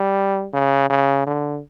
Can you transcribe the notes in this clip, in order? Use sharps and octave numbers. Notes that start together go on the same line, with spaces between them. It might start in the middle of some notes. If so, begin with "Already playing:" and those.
Already playing: G3
C#3
C#3
D3